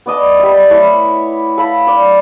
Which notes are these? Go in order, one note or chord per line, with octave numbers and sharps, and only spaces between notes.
B3 D5 D#5 A5
G3 E5
A3 E4 C#5 D6
A4 F5 B5
C#5 D5